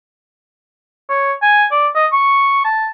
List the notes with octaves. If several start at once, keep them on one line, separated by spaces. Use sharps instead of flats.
C#5
G#5
D5
D#5
C#6
A5